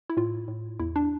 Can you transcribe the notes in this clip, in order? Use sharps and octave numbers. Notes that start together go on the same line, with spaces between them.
E4
A2 F4
A2
E2 E4
D4